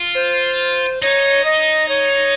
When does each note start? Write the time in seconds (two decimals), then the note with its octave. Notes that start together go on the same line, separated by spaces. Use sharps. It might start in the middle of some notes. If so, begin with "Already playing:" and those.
Already playing: F4
0.15 C5
1.02 D#4 C#5
1.45 D#5
1.89 C#5